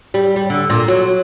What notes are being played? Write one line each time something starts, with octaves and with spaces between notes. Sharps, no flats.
G3
G3
D3
A#2
F#3